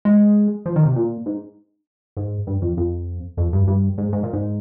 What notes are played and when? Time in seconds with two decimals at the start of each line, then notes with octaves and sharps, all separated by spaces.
0.05 G#3
0.66 F3
0.76 D#3
0.85 C3
0.96 A#2
1.26 G#2
2.17 G#2
2.47 G2
2.62 F2
2.77 F2
3.37 F2
3.53 G2
3.68 G2
3.98 G#2
4.13 G#2
4.23 A#2
4.33 G#2